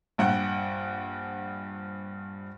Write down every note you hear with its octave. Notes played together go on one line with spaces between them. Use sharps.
A#1 G2 F#5 G5 F#6